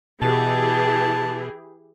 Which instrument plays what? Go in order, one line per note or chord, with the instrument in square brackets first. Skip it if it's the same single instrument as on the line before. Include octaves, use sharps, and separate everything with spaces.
[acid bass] B2 [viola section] E3 G4 G#4 [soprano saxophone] A5